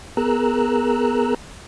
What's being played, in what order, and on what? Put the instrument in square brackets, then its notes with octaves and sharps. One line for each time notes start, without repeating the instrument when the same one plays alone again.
[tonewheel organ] B3 G#4 A#4 A#5 E6 F#6